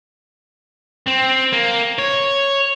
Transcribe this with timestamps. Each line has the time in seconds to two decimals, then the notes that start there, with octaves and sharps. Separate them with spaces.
1.08 C4
1.53 A#3
1.98 C#5